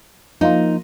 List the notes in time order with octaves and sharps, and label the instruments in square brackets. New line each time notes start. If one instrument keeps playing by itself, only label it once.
[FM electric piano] F3 A#3 F4 [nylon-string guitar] D#4